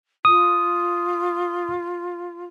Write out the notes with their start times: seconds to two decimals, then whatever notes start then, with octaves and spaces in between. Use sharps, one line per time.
0.25 F4 D#6